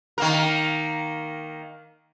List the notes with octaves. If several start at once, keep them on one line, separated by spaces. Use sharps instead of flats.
D#3 A#3 A#4